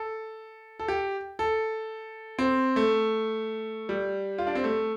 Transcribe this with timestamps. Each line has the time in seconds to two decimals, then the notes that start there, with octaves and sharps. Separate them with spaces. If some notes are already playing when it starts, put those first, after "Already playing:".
Already playing: A4
0.80 A4
0.88 G4
1.39 A4
2.39 C4
2.76 A3
3.89 G3
4.38 F4
4.47 D4
4.55 C4
4.64 A3